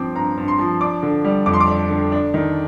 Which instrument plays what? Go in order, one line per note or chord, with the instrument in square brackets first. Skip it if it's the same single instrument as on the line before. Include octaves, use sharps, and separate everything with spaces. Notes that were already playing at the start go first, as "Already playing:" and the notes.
Already playing: [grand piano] G2 F3 C4 D6
G2 A#5
G2
C6
F3
D4 D6
D3
G3
F2 D6
C6
D6
D4
D3
D4
D#3